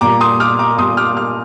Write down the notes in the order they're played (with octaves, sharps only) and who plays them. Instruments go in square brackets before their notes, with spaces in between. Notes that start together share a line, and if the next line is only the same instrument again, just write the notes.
[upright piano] A#2 G3 A#5 D6
C6 D#6
D6 F6
A#5 D6
A#2 G3 C6 D#6
D6 F6
D6 F6